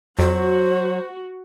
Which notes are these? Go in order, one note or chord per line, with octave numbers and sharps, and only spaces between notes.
F2 F#3 F#4 C5